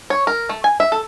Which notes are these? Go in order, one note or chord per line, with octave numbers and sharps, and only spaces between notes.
C#5
A#4
A3
G#5
E5
A4